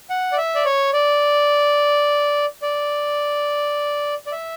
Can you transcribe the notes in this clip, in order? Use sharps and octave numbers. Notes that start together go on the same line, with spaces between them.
F#5
D5
E5
D5
C#5
D5
D5
D5
E5